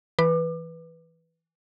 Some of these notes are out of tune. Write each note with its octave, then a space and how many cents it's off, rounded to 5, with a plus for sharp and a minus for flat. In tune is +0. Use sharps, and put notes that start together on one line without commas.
E3 -5 B4 +0 D6 +30